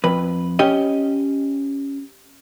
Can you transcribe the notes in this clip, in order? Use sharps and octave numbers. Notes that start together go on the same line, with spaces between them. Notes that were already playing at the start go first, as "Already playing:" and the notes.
F2 B4
C#4 G4 D#5